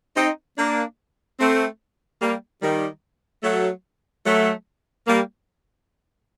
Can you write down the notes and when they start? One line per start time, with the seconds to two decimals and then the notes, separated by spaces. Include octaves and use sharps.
0.17 C4 D#4
0.58 A#3 D4
1.40 A3 C4
2.22 G3 A#3
2.62 D#3 G3
3.43 F#3 A3
4.25 F#3 A3
5.07 G3 A#3